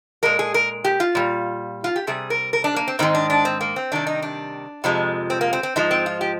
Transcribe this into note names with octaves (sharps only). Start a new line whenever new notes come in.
A#2 G#3 A#4
G#4
A#4
G4
F4
A#2 G3
F4
G4
C3 G3 G#4
A#4
A#4
D4
A#3
C4
G#2 D#3 G#3 C4
D4
D4
C4
A#3
C4
C3 D#3 G3 D4
D#4
D4
F2 C3 F3 G#3
C4
A#3
C4
C4
G#2 F3 G#3 D#4
C4
F4
G4